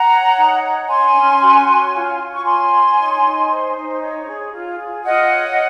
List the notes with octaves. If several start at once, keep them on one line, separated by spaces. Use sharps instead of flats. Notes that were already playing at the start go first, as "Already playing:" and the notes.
Already playing: F#5 A#5
C#5
D#4
C#5
C#5 G#5 C6
C#4
F#4
C#5
F4
F4
C#6
C#5 G#5 C6
C#5
D#4
D#4
C5
D#4
C#5
G#4
F4
G#4
F4 D#5 F#5
C#5